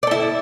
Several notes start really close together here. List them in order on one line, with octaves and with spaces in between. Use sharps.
D5 A4 E4